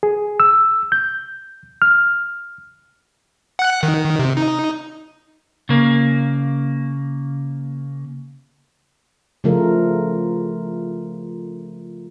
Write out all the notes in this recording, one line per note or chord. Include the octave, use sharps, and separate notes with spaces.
G#4
E6
G6
F6
F#5 F#6
D#3
C3
D#4
C#3 A#3
C#3 F3 A3 F4 A#4